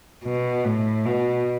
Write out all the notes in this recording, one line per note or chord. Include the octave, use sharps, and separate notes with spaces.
B2
A2
B2